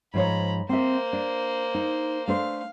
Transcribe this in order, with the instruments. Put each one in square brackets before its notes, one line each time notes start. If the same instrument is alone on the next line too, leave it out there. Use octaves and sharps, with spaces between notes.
[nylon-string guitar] G#2 F3 C#5 [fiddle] A#5 B5
[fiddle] A#3 C5 [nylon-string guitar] C4 E5
[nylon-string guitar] D4
D#4
[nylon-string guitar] A3 D4 C5 [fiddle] F5